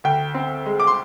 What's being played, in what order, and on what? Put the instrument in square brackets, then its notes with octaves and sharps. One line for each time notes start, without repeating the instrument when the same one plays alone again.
[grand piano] D2 G5
C4
G#3
D6
C6